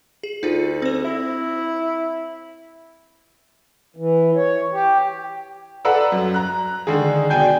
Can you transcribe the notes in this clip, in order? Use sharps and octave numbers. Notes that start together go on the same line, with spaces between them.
G#4
D2 D#4 F4
C4 C5
E4
E3
C#5
G4
A4 B4 D5 F#5 A#5 E6
F#2
A#5 F#6
D3 D#3 G#3 G#4
B2 D4 G5 G#5 G6